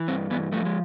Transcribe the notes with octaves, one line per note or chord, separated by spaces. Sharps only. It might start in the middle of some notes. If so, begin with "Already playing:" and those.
Already playing: E3
G2 C4
E3 B3
F3 A3
G#3